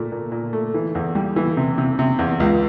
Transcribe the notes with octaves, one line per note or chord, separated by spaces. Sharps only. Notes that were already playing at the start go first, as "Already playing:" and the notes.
Already playing: A#2 A3
A#2
A#2
A3
E3
E2
G3
E3
C3
C3
C3
E2
C#2